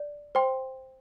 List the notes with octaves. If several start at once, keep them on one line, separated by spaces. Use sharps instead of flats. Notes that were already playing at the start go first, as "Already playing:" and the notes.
Already playing: D5
C5 G5 C6